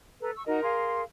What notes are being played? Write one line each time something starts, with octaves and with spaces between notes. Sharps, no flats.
A4 B4 A#5
C#6 E6
D#4 F#4 A#4 D#5
G#4 F5 C6